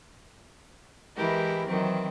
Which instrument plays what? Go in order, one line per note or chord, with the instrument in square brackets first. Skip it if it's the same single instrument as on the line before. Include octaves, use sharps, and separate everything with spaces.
[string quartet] E3 G#3 E4 G4 A#4
D#3 E3 F#3 C4